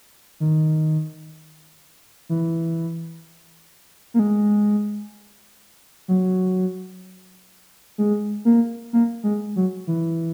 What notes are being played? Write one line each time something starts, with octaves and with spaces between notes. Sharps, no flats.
D#3
E3
A#3
G#3
F#3
G#3
A#3
A#3
G#3
F#3
E3